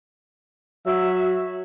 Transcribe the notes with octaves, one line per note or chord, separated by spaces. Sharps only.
F#3 E5